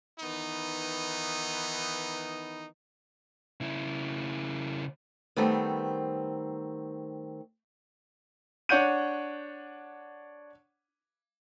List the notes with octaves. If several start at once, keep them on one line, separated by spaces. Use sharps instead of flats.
D#3 E3 B3 D#4
C#3 E4
D#3 G3 A3 B3 C4
D4 C#5 F#5 G6 D#7